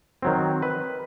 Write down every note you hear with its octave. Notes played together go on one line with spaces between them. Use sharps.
D#3 F#3 C4
B4